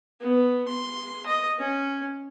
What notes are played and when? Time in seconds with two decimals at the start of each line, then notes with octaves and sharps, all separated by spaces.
0.21 B3
0.68 C6
1.27 D#5
1.59 C#4